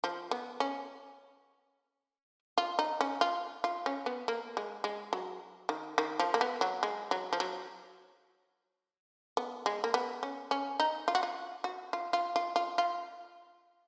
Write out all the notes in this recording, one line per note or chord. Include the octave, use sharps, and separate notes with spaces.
F3
B3
C#4
F4
D#4
C#4
F4
F4
C#4
B3
A#3
G#3
G#3
F#3
D#3
D#3
F3
A#3
B3
F#3
G#3
F#3
F3
F#3
B3
G#3
A#3
B3
C#4
C#4
D#4
F4
F#4
F4
F#4
F4
F4
F4
F4
F4